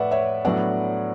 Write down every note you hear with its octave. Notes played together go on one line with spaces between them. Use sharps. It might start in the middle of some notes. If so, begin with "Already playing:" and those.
Already playing: A2 A3 B4 D5 E5 F#5
C#5 E5
A2 F#3 B3 D4 D5 F#5